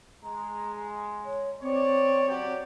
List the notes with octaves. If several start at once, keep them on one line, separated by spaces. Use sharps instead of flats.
G#3 A#5
C#5
C4 C#5 D5
F#3 G4 D5